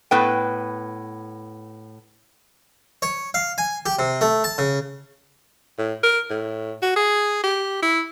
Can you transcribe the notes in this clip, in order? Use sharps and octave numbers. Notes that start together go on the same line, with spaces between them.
A2 B3 B4 G5
C#5
F5
G#5
G4
C3
A3
A5
C#3
A2
A#4
A2
F#4
G#4
G4
E4